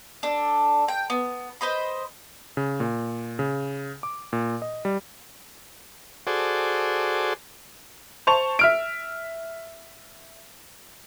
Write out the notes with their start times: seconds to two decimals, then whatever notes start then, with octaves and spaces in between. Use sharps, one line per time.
0.23 D4 A4
0.88 G5
1.10 B3
1.61 B4 C5 D#5 B5
2.57 C#3
2.80 A#2
3.39 C#3
4.03 D6
4.33 A#2
4.62 D#5
4.85 G3
6.27 F#4 G#4 A4 C5 D5
8.27 C5 A5 C#6 F7
8.59 E5 F6 D7